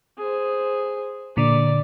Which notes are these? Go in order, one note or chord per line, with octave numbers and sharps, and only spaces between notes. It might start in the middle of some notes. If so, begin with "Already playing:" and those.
G#4 C5
A#2 D3 D5